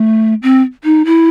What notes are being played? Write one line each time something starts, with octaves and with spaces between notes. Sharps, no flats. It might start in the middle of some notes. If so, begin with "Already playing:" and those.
Already playing: A3
C4
D#4
E4